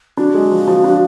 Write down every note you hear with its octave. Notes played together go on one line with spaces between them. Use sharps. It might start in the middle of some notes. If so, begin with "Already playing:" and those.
D4 F#4
G#3
F3
F3
D4